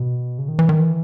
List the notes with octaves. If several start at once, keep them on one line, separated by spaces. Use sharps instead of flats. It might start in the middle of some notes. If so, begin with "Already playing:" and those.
Already playing: B2
C#3
D#3
E3
D#3
E3